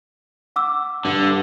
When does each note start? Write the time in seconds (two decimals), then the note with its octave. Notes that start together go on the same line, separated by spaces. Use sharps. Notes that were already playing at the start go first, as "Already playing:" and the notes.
0.56 F#5 D6 E6
1.05 G2 D3